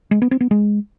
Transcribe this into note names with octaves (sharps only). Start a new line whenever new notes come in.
G#3
B3
C4
B3
G#3